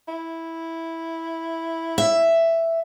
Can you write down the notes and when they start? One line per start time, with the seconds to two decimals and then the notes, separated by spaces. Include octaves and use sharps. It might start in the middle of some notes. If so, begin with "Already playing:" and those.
0.08 E4
1.98 E5